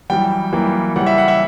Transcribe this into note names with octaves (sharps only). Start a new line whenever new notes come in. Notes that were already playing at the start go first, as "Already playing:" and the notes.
F#2 E3 G3 G5
F#2 E3 G3 A#3
C#3 E3 G3 F#5
E5
F#5
E5